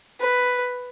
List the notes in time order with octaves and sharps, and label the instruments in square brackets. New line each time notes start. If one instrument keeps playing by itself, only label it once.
[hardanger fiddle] B4